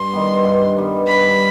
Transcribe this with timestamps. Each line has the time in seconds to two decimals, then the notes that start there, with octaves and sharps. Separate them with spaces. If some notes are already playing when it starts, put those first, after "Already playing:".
Already playing: G2 C6
0.13 D#3 G3 B3
0.45 G2
0.76 D#3 G3 B3
1.07 G2 B5